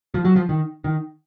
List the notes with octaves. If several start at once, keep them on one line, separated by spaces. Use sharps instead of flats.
F3
F#3
F3
D#3
D#3